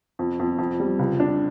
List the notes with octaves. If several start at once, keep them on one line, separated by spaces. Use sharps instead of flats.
F2
F2
F2
G3
C#2
D4